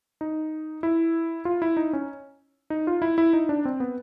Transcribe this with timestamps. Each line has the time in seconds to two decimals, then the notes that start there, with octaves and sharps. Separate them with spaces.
0.21 D#4
0.83 E4
1.45 F4
1.62 E4
1.77 D#4
1.93 C#4
2.70 D#4
2.87 F4
3.02 E4
3.18 E4
3.33 D#4
3.49 D4
3.65 C4
3.80 B3